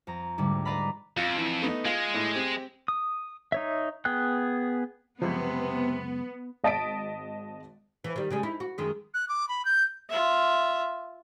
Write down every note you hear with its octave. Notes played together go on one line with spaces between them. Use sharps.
F2 A#5
D2 G#2 D3 G3
B4 D5 D#5 F5 A#5 B5
F2 F4
E3
A3 B3 D#4
G#3 F4
A2
C4 G4
D#6
D#4 C#5 E5
B3 G#4 G5 F#6
C#2 F#2 C3 F3 G#3 B3
G#1 D#5 A5 A6 B6 D7
E3
D#3 G3
C#3 G3 G#3
D#4 E4
F#4
F#2 D#3 G#3
F#6
D6
B5
G6
F4 E5